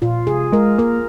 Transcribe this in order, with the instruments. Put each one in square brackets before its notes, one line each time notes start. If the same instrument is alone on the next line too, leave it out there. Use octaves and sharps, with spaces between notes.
[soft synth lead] A#2 [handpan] F4
[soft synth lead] C3 [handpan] G#4
[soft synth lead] G#3 [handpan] A#4
[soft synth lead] A#3 [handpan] A#4